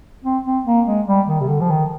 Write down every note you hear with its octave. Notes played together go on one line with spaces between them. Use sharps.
C4
C4
A#3
G#3
G3
D#3
C3
D3
F3
D#3